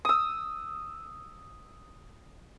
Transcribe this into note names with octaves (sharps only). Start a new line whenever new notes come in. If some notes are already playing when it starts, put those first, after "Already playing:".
D#6 E6